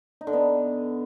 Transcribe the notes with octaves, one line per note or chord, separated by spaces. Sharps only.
D#4
D3
B3